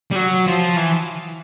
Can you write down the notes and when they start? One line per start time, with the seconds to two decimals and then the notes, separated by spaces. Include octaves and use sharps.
0.11 G3
0.16 F#3
0.47 F3
0.76 E3